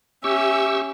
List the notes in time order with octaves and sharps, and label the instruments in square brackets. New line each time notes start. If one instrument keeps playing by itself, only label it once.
[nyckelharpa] C#4 E5 [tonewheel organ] G4 C#6 E6